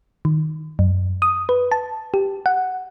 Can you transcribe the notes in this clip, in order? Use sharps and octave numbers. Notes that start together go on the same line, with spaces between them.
D#3
F#2
D#6
B4
A5
G4
F#5